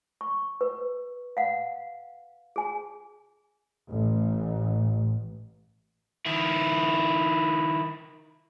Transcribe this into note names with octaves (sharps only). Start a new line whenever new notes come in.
C#6
B4
F5 F#5
G#4 G#5
A1
D#3 E4